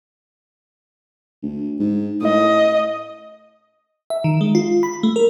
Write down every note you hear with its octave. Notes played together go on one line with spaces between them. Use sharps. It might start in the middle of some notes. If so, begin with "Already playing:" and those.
D2
G#2
A2 D#5
E5
D#3
G#3
F4
B5
A3
A#4